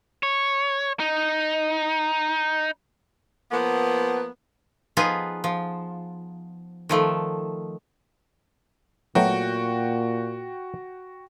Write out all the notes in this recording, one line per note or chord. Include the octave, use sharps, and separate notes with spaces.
C#5
D#4
F3 A#3 B3
F3 B3 D#4 F4 G#4 B4
F3
D#3 F3 A3
A#2 F#3 A3 B3 F#4 G5